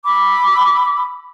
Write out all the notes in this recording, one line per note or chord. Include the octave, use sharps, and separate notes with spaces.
B5 D6 E6